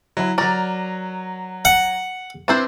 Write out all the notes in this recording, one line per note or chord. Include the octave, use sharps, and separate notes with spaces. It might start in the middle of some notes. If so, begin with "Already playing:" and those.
F#3 E4 B5
F#3 A#4 D5 A#5
F#5
C4 D4 E4 B4 C5